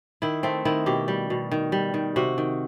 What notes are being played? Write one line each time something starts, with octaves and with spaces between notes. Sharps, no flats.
D#3 E4
A3 C4
D#3 E4
B2 G4
G3
B2
D#3
G3
D#3
C3 F#4
D#3